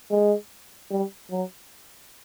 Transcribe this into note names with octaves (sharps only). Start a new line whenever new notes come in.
G#3
G3
F#3